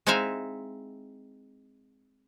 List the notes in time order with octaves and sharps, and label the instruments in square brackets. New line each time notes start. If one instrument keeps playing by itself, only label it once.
[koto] G#3 C4 D#4 E4 E5 F5